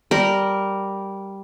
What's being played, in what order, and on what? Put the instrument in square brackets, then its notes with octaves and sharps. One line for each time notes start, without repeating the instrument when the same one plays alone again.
[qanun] G3 A#4